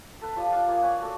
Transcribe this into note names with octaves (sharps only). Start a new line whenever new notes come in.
A4 B4
F3 G3 D#6
D5 D#5 F5 F#5
A#3 F4 G#4
C#5 F#5 G#5 B5
F#4 A4 D5